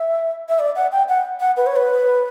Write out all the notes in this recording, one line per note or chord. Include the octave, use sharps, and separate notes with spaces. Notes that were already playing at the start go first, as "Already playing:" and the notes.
Already playing: E5
E5
D5
F#5
G5
F#5
F#5
B4
C#5
B4